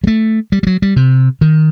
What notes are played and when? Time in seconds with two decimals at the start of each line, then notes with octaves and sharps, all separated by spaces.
0.04 G3
0.07 A3
0.52 G3
0.63 G3
0.67 F#3
0.82 G3
0.96 C3
1.41 D#3